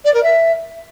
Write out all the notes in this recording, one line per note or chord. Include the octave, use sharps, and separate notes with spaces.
D5
A#4
E5